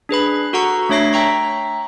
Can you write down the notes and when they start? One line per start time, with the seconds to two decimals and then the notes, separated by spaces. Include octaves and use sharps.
0.09 D4 G#4 B4 B5
0.53 F#4 A4 F#5 A#5 C#6
0.89 A3 D4 C#5 E5 A#6 C7
1.13 E5 G5 A#5 C#6